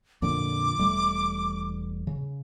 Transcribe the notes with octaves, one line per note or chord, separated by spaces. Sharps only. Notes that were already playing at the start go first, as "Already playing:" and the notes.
F2 A#2 D3 D6
E1 G3 A3
C#3